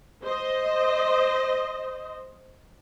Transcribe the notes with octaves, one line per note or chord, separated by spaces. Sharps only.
C5 D#5